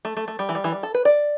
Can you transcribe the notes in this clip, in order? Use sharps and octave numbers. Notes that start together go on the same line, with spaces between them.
A3
A3
A3
G3
E3
G3
E3
G3
A4
B4
D5